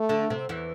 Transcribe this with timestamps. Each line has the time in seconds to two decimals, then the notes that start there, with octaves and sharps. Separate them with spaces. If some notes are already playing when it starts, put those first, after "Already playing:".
Already playing: A3
0.09 D3 D4
0.30 C3 C4
0.49 E2 E3